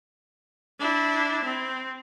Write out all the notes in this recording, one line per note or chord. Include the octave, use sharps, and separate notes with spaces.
D4 E4
C4